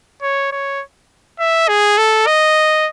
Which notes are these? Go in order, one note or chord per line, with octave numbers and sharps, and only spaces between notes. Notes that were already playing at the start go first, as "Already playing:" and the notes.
C#5
C#5
E5
G#4
A4
D#5